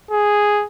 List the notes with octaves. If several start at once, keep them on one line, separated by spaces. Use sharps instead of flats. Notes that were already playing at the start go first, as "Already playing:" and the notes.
G#4